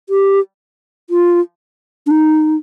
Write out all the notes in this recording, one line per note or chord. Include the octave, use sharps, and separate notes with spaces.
G4
F4
D4
D#4